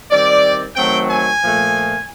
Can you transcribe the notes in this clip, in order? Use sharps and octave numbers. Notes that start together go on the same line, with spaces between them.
D#3 G3 C4 D5
D#3 F#3 A3 C4 G5
G#5
A#2 F3 A3